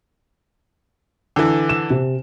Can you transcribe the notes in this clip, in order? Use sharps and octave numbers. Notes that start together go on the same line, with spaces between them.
D3 E3
E7
C3